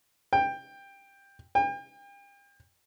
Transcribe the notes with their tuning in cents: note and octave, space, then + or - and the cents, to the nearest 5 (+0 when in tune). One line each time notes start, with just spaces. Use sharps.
G5 +15
G5 +40